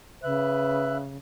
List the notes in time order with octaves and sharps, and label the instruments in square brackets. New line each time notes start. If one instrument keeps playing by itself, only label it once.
[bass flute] C#3 [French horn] B4 [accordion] E5 F#6